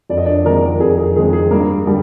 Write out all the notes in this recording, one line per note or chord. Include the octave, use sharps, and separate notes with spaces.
F2 D5
D#5
D4 D5
D#3 G#3 A#3 C4 A#4
F2 G#4
G#4
D#3 G#3 C4 G#4
G#4
G2 A#3 A#4
D3 G3